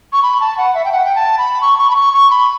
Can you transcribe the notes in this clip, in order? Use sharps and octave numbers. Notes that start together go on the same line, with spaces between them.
C#6
B5
A5
F#5
E5
G5
F#5
G5
A5
B5
C#6
C#6
B5
C#6
C#6
B5